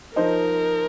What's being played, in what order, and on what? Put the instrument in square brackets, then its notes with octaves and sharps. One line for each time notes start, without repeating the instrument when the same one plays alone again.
[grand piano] F3 D#4 C5 D#5 [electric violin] A#4